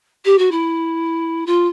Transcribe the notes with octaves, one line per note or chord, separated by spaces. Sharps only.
G4
F#4
E4
F4